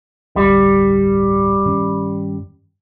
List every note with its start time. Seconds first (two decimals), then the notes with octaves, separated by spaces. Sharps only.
0.36 D1 G1 G3
1.66 G2 D#3 C#4